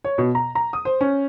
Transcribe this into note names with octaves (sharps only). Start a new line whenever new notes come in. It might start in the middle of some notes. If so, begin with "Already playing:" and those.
C#5
B2
A#5
A#5
D#6
C5
C#4